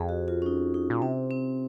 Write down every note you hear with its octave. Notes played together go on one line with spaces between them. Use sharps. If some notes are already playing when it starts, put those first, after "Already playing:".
Already playing: F2 G#4
F#4
F4
C#4
D#4
D#4
A#2
C3 C4
C4